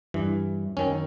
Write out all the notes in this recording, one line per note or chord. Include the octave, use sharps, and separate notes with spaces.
G2 E3
F#2 D#3 C#4